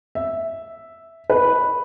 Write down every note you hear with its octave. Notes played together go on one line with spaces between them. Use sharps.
E5
B4